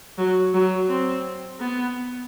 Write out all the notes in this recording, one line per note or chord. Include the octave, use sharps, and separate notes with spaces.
F#3
F#3
C4
B3